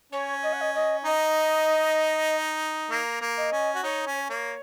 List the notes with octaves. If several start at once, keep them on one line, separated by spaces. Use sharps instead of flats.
C#4 C#5
D#5
F#5
D#5
D#5
D#4 D#5
A#3 A#5
A#3
D#5
C#4
F#4
D#4 C#5
C#4
A#3 C#5